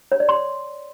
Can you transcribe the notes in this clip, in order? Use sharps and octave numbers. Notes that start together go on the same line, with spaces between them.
C#5
D5
C6